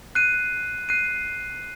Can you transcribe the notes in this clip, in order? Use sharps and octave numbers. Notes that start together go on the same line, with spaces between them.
F#6 C7 D#7
F#6 C7 D#7